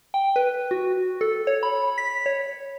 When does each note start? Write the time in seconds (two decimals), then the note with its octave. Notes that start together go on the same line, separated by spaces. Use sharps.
0.14 G5
0.36 B4
0.71 F#4
1.21 A4
1.47 C#5
1.63 B5
1.98 B6
2.26 C#5